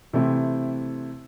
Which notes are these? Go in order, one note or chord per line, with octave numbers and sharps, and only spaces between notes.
C3 E3 A3 C4 E4